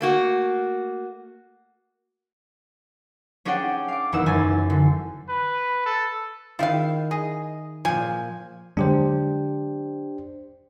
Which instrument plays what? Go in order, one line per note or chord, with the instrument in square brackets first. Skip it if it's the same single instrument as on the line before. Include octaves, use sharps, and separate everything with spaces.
[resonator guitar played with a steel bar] A3 A#3 F#4
[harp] C#4 D4 G#4 C#5 F#5 G5
F5 D6
D#1 E2 D#4 F#5 E6 E7
F#1 F#2 E3 C#4 G#5 A6
D3
[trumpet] B4
A4
[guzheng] D#3 E4 [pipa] F4 F5
[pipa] G#4 [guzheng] D#5
[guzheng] A#2 F3 [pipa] G#5
[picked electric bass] D3 F#3 G#3 [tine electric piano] D4 G4 C5